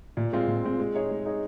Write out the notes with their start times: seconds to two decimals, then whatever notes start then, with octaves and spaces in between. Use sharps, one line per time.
0.17 A#2
0.33 G#3 C4 F4
0.48 A#2
0.64 G#3 C4 F4
0.79 G#3
0.95 D#4 G#4 C#5
1.11 G#3
1.25 D#4 G#4 C#5